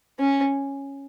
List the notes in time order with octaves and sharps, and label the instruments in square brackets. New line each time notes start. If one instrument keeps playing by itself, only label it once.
[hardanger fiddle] C#4